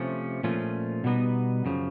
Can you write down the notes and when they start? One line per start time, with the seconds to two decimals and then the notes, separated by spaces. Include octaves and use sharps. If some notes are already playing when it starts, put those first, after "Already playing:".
Already playing: C3 F3 A3 C#4
0.43 A#2 F3 A3 C#4 F4
1.04 B2 G3 B3 D#4
1.65 F#2 C#3 F3